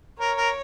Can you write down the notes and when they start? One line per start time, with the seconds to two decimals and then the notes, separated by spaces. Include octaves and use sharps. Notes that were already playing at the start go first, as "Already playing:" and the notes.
0.20 A#4 C#5
0.37 A#4